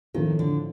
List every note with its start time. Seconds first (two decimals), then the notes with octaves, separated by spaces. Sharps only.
0.14 A2 D#3 F3 A3 C4 F4
0.39 D3